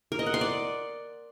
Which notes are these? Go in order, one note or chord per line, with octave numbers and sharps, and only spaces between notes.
A#4
D#5
F#5
C6
D5